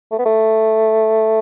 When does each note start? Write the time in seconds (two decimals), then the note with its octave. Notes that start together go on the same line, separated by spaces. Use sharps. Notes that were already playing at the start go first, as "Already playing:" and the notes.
0.11 A3
0.19 B3
0.26 A3